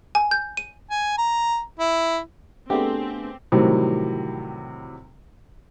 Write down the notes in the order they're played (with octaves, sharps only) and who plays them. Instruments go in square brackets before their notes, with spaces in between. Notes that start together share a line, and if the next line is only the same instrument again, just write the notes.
[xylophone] G#5
G6
D#7
[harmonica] G#5
A#5
E4
[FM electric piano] A3 B3 [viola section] C4 [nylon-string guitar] D4 G#4 [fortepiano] G4
[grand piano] A2 C3 D#3 E3 F#3 G3